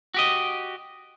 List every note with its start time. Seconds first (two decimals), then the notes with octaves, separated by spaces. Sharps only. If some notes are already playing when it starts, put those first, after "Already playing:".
0.14 F#4 G4 D#5